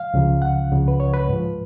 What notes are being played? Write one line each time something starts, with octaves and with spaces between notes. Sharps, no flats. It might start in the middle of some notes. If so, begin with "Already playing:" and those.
Already playing: F5
C#2 C#3 F3
F#5
C#2 C#3 F3
B4
C#5
B4
G#2 F3